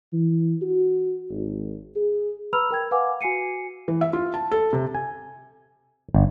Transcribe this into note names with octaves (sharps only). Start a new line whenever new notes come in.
E3
F#4
G#1
G#4
B4 A#5 B5 E6 F6 F7
A#4 G5 G#6
B4 F5 F#5 G#5 D6
F#4 G#5 C7 C#7 D#7
E3
E5
F4
A5
A4
C3
G#5
G1